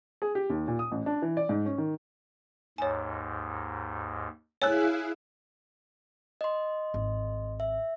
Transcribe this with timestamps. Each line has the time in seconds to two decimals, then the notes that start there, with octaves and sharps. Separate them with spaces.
0.22 G#4
0.35 G4
0.50 D#2
0.68 A#2
0.79 D#6
0.92 A1
1.06 D4
1.22 E3
1.37 D5
1.49 G#2
1.65 C#4
1.78 D#3
2.78 D#2 G#2 C#5 G#5
4.62 E4 G#4 C#5 F5 G#5 E6 F#6
6.41 D#5 C6
6.94 G#1
7.60 E5